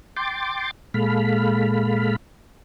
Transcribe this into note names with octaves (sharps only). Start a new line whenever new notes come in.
G5 C6 D6 A6
A#2 G#3 A4 F5 B5